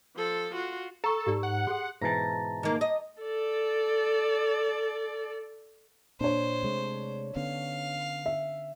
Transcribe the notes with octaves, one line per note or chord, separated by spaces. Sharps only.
F3 A4
F4 F#4
A4 A#5 C#6
G#2 G4 D5
F#5
G#4 A4 C6
G#2 B2 E3 A5 A#5
D#3 A#3
D#5
A4 D5
A#2 D4 C5 C#5
C3 G#3 A3
D3 B3 C#4 F5
E5